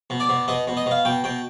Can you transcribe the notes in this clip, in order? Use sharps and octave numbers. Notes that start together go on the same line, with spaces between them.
B2
D5
B2
B2 D#5
B2
D#5
B2 F5
B2 G5
B2 G5